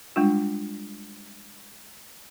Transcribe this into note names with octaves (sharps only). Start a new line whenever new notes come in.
G3 G#3 D4 F4